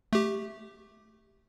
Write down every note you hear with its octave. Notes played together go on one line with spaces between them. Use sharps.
A3 G4